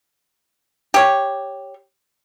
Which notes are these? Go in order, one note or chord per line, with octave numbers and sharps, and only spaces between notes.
G4 C#5